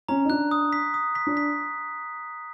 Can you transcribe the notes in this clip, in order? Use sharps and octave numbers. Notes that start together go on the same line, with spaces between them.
C#4 A#5
D#4
D4 F#6
D#6
B6
D#6
B6
D4
B6